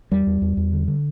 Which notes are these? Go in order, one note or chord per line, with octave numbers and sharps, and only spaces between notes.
E2 G3
E2
E2
E2
D3
D3